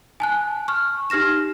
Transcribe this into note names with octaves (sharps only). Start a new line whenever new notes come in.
G#5 A5 F#6
C#6 F6
D#4 G4 F6 A#6 E7